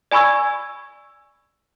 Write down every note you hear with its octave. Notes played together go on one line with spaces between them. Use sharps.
D5 G#5 B5 C#6 E6 G#6